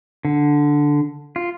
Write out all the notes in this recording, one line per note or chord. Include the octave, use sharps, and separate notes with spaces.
D3
F4